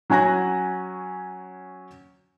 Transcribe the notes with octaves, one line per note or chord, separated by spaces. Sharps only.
F#3 C#4 G#5 F#6 A#6